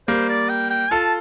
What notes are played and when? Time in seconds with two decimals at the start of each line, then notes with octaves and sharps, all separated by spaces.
0.08 G3 A#3 C5
0.29 D5
0.49 G5
0.70 G5
0.91 F4 A4 A5